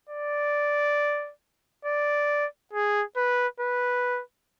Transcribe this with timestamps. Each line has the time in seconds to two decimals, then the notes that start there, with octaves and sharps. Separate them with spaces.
0.09 D5
1.85 D5
2.73 G#4
3.17 B4
3.60 B4